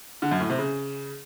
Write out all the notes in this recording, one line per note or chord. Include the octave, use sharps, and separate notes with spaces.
D3
F#2
A2
C3
C#3